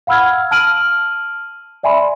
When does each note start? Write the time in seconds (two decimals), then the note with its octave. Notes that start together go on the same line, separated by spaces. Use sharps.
0.07 F5 F#5 B5 E6 F6 G#6
0.51 A5 E6 F6 D7 D#7 F#7
1.83 D5 E5 G#5 B5 C6